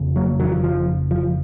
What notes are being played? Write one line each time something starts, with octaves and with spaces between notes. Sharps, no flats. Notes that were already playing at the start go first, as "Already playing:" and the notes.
Already playing: F#1 F2 C#3
F#3 A#3
D#3 F#3
F3
F3
F3